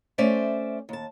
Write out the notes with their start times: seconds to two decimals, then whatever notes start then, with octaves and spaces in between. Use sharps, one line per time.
0.18 A3 C#4 C5 D5 E5
0.89 D#2 A5